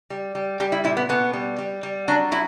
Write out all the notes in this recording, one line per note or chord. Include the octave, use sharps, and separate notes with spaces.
G3
G3
G3 G4
E4
A#2 E4
B3
B2 B3
G3
G3
G3
F#3 D4
F#3 E4